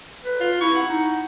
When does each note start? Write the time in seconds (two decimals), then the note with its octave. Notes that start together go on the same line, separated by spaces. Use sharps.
0.24 B4
0.40 F4
0.61 E4 C#6
0.76 F#5
0.89 D#4